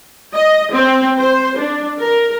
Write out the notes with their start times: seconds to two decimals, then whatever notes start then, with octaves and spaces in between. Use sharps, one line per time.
0.34 D#5
0.72 C4
1.18 C5
1.57 D4
2.00 A#4